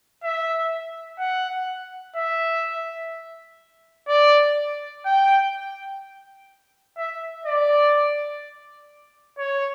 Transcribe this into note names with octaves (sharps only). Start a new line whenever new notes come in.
E5
F#5
E5
D5
G5
E5
D5
C#5